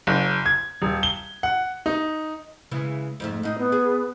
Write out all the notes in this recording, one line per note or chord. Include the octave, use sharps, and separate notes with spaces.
F#1
G#6
D#1
G7
F#5
D#4
C#3 E3 G#3
F2 G#2 A3
A2 D#4 D#5
B3
G#4